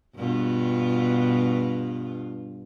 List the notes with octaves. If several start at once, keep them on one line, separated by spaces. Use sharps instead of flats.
G2 B2 F4